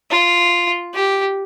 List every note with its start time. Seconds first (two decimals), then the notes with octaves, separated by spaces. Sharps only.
0.11 F4
0.94 G4